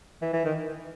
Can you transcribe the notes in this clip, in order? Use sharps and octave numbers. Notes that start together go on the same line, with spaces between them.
E3
E3
D#3